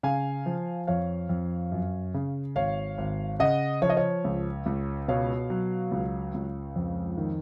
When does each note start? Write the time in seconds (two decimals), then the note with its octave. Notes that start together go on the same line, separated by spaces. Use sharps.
0.03 C#3 F5 G#5
0.46 F3
0.87 F2 C#5 F5
1.29 F2
1.72 F#2
2.14 C#3
2.55 G#1 C#5 F5
2.98 G#1
3.40 C#3 D#5 F#5
3.82 F3 C#5
3.90 D#5
3.97 C#5
4.25 C#2
4.66 C#2
5.08 B2 C#5 F5
5.50 F#3
5.91 C#2
6.34 C#2
6.76 F2
7.18 D#3